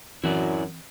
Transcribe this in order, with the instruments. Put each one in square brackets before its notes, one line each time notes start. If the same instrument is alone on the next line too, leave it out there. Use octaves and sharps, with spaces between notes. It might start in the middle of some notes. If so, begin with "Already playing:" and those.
[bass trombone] F#2 [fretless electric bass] E3 C4 [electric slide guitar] E4 F#4 D5